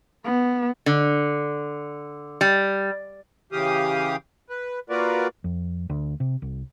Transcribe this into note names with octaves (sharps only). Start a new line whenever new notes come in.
B3
D3
G3
C#3 E3 G4 F5 D#6
B4
A#3 F4 F#4 A#4 B4 D5
F2
D2
C3
C2